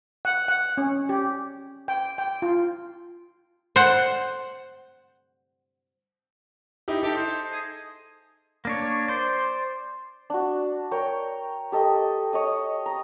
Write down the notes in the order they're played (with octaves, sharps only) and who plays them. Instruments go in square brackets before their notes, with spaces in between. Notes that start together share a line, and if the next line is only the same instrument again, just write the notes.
[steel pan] F#5
F#5
C#4
G4
G5
G5
F4
[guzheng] C5 F#5
[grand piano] D#4 E4 G4
[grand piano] D#4 A4 E5 [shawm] G4
[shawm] C5
G#4
[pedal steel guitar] A#3 D4 C#5
C5 D5
[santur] D4 F#4
A#4 C#5 G5
G4 A4 D#5
C#5 D#5 D#6
A#5